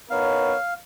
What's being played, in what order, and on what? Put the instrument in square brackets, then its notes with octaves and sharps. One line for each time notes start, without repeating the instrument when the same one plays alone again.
[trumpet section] B3 D#4 A#4 C#5 [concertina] F5